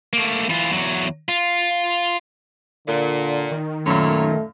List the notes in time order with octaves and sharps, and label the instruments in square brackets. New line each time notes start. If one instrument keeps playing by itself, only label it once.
[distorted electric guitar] A3 A#3
E3 F4
E2 F#3
F4
[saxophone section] A#2 [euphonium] D3
[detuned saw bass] D#3
[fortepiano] F#2 A#2 [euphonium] A3 [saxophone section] E4 C#5